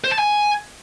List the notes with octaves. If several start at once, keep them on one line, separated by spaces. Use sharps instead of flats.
C5
A5
G#5